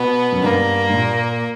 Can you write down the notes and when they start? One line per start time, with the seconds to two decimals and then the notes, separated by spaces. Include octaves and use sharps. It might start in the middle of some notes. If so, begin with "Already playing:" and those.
Already playing: B2 B3
0.32 F#2
0.43 G2 A#3
0.89 G2
0.94 A#2